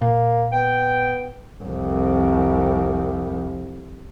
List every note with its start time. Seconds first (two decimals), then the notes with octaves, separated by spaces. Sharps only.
0.02 A#2 A#3
0.52 B3 G5
1.63 C2 F2